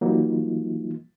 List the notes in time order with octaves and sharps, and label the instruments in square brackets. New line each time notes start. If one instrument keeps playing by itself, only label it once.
[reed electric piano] E3 F#3 G3 A#3 D#4 F4